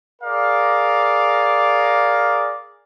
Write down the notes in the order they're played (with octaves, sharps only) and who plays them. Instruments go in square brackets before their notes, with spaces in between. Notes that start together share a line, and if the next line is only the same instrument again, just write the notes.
[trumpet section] G#4 A#4 D5 F5